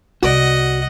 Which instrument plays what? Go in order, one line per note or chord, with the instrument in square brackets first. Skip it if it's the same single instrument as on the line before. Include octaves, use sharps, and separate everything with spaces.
[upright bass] C2 [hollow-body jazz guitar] F#4 D5 [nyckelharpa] D#5 F#5